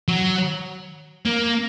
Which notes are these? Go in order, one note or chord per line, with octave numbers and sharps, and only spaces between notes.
F#3
A#3